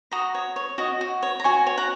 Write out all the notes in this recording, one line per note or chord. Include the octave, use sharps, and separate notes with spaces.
F#4 A#5 D#6
C#5
C#5
F#4 D#5
F#4
C#5
A#5
F#4 G#5 C#6
C#5
F#5 A#5